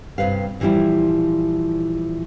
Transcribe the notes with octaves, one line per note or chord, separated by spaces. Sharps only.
G2 C3 F#3 B4 F5
A#2 E3 F3 G3 E4